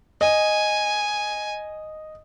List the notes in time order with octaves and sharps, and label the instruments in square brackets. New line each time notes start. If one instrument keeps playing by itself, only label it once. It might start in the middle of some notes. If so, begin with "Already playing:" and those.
[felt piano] D#5 [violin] G#5